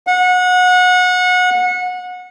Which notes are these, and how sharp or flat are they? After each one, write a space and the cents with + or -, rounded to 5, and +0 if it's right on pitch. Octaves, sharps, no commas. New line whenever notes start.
F#5 -25